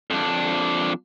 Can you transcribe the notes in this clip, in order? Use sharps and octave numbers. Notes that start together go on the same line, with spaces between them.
F2 D4